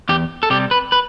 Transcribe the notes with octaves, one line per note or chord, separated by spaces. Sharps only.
E2 G4
A4
C3 G3 G4
B4
B4